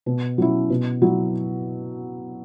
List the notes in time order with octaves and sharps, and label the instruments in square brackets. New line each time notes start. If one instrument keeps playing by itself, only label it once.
[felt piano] B2
F#3 C#4 E4
B2
F#3 E4